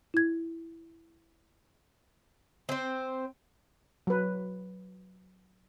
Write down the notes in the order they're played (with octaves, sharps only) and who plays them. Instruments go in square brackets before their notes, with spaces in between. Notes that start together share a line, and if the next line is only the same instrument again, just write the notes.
[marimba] E4 G#6
[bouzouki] C4 C5
[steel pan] F#3 B4